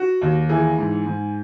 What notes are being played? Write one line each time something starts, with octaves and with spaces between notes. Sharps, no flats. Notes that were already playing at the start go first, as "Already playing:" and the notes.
Already playing: F#4
D#2
E3 G#4
G#2
G#2